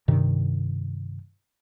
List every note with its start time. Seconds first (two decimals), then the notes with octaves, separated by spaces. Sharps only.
0.08 G2 C3 D#3